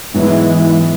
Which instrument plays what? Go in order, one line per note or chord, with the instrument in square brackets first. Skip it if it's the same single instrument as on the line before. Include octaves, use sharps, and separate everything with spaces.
[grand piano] G#2 F#3 B3 E4 [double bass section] E3 G#3